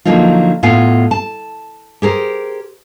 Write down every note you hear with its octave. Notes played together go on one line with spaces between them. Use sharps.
D3 F3 F#3 A#3 D#4 F4
A2 B3 F4 F5 G#5
A5
G4 G#4 A#4 C5